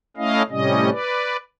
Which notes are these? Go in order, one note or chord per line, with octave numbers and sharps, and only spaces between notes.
A3 C#4 E4 D#5 F5
A2 C3 G3 C#4 D#5
B4 D5